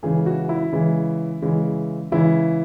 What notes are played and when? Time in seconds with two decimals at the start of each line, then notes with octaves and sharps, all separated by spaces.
0.03 C#3 E3 G#3 G#4
0.26 F#4
0.49 E4
0.72 C#3 E3 G#3
1.42 C#3 E3 G#3
2.12 C#3 E3 G#3 E4